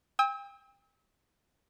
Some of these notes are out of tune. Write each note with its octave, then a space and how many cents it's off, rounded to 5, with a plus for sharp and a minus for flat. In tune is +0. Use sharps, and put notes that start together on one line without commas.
G5 +35 E6 -35